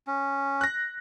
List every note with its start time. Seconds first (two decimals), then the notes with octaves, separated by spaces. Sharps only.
0.07 C#4
0.61 F#6 A#6